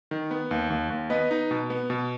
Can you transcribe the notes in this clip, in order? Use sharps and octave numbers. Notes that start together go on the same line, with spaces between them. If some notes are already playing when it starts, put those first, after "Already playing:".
D#3
B3
D#2
D#2
D#2
B3 B4 D#5
D#4
B2
B3
B2